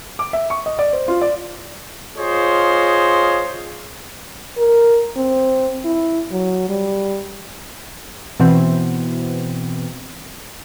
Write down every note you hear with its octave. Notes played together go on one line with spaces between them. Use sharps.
D6
E5
C#6
D#5
D5
C5
F4
D5
F4 G#4 C5 C#5 D#5
A#4
C4
E4
F#3
G3
B2 E3 B3 C4